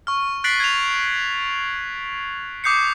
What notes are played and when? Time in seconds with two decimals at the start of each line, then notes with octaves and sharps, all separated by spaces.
0.07 C#6 F6
0.44 F#6 A6 B6 C7 D7 F#7
0.60 G#6 F7
2.64 D6 D#6 G6 C7 C#7